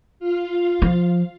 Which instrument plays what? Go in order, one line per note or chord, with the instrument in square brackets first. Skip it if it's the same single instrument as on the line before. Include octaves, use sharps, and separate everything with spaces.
[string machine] F4 F5
[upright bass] F3